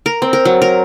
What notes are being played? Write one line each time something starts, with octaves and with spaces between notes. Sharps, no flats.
A#4
C4
A#4
F#3
A#4